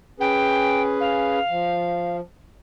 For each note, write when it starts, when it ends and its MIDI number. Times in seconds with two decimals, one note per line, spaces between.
0.20 1.39 61
0.20 1.39 68
0.20 1.39 71
0.20 0.82 79
1.00 2.16 77
1.50 2.20 53